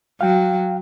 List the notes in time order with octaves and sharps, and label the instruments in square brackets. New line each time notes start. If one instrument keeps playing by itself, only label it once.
[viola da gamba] F#3 [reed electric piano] F5 G5